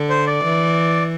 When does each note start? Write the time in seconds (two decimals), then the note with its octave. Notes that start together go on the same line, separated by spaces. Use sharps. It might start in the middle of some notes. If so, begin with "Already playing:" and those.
Already playing: D3
0.10 C5
0.27 D5
0.44 E3